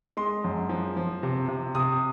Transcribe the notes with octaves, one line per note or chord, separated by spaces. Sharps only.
G#3 C6
F#2
F3
F3
C3
C3
C3 D#6